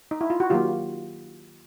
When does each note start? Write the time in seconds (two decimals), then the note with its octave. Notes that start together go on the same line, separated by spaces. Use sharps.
0.11 D#4
0.21 E4
0.30 F4
0.40 F#4
0.50 D#3 F#3 A#3 F4 G4